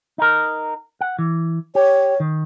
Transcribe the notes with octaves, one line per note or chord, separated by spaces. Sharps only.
D#4 A#4
F#5
E3
G4 C#5
D#3